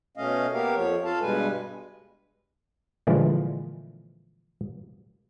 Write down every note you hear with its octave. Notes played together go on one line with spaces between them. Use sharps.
B2 A3 C#4 D#5 F5
A#3 B3 G4 A#4 F5
F2 F3 C#5
F4 A4 F5 A5
G2 B2 G3 G#3 B4 G#5
A#2 D3 E3 F3 G3 G#3